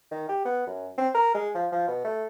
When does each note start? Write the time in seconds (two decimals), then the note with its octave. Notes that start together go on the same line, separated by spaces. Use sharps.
0.11 D#3
0.29 G4
0.45 B3
0.66 F#2
0.98 C4
1.14 A#4
1.34 G#3
1.55 F3
1.72 F3
1.88 B2
2.04 A3